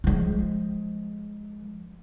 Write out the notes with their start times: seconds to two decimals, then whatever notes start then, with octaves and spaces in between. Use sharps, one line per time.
0.04 F3 G#3